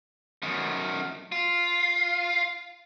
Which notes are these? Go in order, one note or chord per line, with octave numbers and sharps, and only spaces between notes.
F#2 D#3
F4